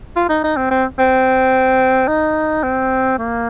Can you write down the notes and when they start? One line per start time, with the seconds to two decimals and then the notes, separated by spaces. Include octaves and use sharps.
0.16 F4
0.29 D#4
0.44 D#4
0.57 C4
0.71 C4
0.99 C4
2.08 D#4
2.63 C4
3.18 A#3